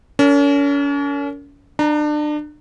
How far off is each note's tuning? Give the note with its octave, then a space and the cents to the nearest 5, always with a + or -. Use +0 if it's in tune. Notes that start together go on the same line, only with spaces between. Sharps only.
C#4 +40 A#4 -20
D4 +30 A#5 +0